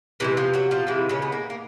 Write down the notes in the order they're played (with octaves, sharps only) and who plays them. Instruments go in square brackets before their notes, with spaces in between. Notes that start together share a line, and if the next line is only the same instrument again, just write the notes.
[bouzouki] C3 D#3 E3 G#3 E4
F3 F4
F#3 F#4
F3 F4
C3 D#3 E3 G#3 E4
C#3 C#4
B3
A#3
A#3